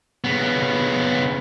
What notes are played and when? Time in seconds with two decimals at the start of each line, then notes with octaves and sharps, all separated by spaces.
0.24 C#3 B3